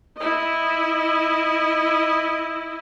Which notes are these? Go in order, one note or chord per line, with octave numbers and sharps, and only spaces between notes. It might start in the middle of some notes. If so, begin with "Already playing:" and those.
E4 D#5